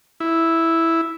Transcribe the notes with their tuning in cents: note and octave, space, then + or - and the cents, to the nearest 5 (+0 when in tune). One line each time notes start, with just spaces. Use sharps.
E4 +0